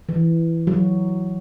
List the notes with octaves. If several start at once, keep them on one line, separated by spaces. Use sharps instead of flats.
E3
F#3